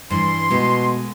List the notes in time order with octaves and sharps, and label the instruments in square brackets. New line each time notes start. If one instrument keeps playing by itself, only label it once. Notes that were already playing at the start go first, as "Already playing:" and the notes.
[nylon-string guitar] G2 E3 [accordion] C6
[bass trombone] B2 [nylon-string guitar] G#3 A3 B3